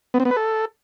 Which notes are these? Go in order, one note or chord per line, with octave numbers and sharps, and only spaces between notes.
B3
C4
B3
B4
A4